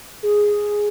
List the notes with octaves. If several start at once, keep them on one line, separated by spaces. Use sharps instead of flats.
G#4